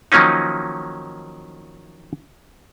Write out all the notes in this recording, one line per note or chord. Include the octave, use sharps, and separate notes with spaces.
D#3 F3 F#3 A#3 C#4 D#4